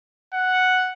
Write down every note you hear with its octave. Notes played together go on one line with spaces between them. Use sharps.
F#5